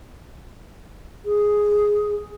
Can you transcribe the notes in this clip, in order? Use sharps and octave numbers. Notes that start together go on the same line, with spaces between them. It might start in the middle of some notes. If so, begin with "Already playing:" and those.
G#4